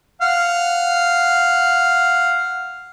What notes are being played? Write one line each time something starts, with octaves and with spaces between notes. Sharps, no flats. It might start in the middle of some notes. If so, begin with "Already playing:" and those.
F5 F#5